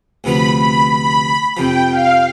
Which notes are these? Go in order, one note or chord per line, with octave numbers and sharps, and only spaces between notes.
D2 C3 F3 B3 F4 B5
B5
B5
F2 C3 F3 G5
F5